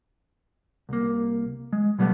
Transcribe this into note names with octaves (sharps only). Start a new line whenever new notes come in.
C2 A#3
G#3
B2 F#3 G3 A3 B3